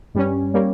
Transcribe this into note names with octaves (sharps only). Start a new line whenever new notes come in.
G2 G3 C#4
G3 A#3 C#4